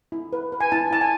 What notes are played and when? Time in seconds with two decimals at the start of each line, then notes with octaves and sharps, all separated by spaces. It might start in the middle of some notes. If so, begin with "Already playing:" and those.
0.12 E4
0.33 B4
0.52 B4
0.60 G#5
0.72 E4 A5
0.91 E4 A5
1.01 G#5